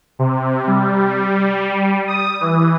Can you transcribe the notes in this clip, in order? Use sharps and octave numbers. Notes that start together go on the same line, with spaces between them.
C3
G3
D#6
E3